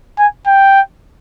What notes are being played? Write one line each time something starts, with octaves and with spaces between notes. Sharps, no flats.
G#5
G5